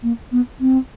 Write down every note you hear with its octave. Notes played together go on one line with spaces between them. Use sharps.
A#3
B3
C4